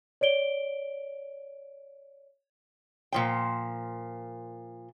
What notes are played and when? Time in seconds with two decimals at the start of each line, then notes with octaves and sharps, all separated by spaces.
0.21 C#5 D5 D7 G7
3.12 A#2 F3 G5